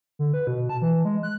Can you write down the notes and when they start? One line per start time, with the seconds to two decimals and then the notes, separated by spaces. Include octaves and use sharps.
0.19 D3
0.34 B4
0.47 B2
0.69 A5
0.82 E3
1.05 G#3
1.23 F#6